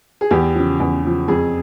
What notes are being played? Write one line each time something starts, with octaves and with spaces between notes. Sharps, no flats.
G#4
E2 G4
C#3 F3
E2
C#3 F3
F2 G#4